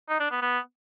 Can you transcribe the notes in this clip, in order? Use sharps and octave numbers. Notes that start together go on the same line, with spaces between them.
D#4
D4
B3
B3